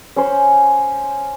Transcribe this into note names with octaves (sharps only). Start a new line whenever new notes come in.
C#4 C5